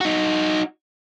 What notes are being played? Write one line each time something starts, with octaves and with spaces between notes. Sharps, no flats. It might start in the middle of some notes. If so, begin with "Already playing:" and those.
D#4 F#4